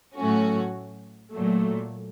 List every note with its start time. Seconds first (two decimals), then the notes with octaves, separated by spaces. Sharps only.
0.16 A2 F#3 A3 C#4 F#4
1.32 A#2 F#3 A3